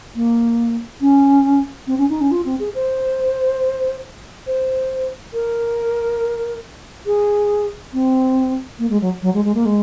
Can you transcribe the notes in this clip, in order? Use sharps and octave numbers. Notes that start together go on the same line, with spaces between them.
A#3
C#4
C4
C#4
D#4
C#4
F4
C4
G#4
C5
C5
A#4
G#4
C4
A#3
G#3
F#3
F#3
G#3
G#3
A#3
G#3